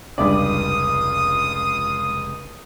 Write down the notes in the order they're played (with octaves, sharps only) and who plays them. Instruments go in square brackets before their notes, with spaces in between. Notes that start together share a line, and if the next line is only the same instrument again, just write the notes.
[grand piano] F1 C#2 [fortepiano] G2 D5 [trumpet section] F4 D#6